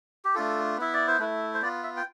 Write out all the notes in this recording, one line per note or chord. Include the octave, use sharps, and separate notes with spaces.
G4
A3 D4 F4 A4
B3 E4 E5
D5
C5
A3 E4 B4
C5
B3 F4 D5
E5
G5